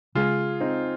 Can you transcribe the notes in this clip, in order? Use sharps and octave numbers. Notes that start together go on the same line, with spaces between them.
C#3 G#3 C#4 F4 G#4
C4 D#4